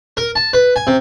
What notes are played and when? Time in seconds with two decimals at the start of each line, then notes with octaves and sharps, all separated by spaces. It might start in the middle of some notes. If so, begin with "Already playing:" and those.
0.17 A#4
0.36 A5
0.53 B4
0.76 G#5
0.87 C3